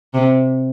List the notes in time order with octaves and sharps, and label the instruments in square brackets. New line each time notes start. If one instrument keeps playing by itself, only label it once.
[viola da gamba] C3